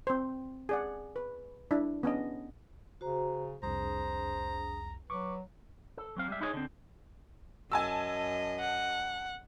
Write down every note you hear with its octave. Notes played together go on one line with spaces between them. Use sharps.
C4 C5
G#4 D5 F#5
B4
D4 E4
B3 C#4 D4 D#5
C#3 F#4 C5 A#5
C2 F2 D4 G#4 C5 A#5 D#6
F#3 B4 C#6 D6
A4
F#3 C4 F5
G3 G#3 E5
D#4 E4 G#4 C#5 D#5
D3 C4
F#2 D#5 G#5 A5 E6
F#5